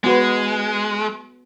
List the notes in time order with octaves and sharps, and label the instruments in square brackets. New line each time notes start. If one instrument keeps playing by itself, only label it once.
[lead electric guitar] G#3 [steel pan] B3 F#4 B4